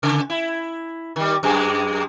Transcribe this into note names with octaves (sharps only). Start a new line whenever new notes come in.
C#3
E4
D#3 G3
F#2 G#3 G#4